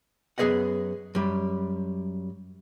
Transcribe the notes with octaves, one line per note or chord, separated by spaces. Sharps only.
F#2 B3 G#4 C5 D#5 F#5
F#2 G3